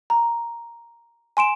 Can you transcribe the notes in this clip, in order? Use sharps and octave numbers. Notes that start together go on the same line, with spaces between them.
A#5
G#5 C6 D7 E7